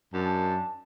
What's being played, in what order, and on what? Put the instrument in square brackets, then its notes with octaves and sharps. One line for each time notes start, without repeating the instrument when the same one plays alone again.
[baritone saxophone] F#2 [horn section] D#3 D4 A5